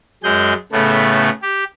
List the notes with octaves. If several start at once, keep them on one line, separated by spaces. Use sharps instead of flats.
F#2 G#3 G#4 G6
A2 C#3 A3 B3
G4